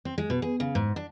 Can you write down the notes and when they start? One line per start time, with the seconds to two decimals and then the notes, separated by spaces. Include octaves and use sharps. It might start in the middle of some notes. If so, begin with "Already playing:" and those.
0.05 C4
0.18 G#3
0.30 B2
0.42 G#4
0.60 C#3
0.75 G#2
0.96 D4